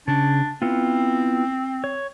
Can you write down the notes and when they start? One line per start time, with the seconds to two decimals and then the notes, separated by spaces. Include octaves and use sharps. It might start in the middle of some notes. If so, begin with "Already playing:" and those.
0.08 C#3 D4
0.62 B3 C4 E4 F4
1.84 C#5